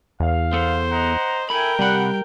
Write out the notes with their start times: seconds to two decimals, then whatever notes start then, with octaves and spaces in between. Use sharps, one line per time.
0.20 E2 F5
0.53 B3 A4 C5
0.90 D#5 F#5 A#5
1.50 E4 A4 A#4 G5 G#5 B5
1.79 C3 G3 F#5 B5